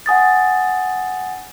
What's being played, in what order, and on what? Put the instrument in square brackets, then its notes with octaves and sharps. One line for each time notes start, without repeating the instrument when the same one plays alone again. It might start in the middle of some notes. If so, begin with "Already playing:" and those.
[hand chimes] F#5 G#5 D#6 A6